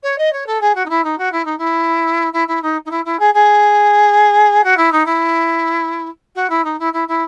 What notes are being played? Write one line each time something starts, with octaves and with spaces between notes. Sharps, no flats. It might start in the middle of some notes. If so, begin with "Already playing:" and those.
C#5
D#5
C#5
A4
G#4
F#4
D#4
E4
D#4
F#4
E4
D#4
E4
E4
E4
D#4
D#4
E4
E4
G#4
G#4
F#4
E4
D#4
E4
F#4
E4
D#4
E4
E4
E4